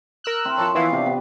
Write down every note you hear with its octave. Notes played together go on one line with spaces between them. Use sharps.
A#4 E6 F#6
C4 E4
F3 C#5 A5
E3 B3 E4 F5
C3 D4 G4
B3 B4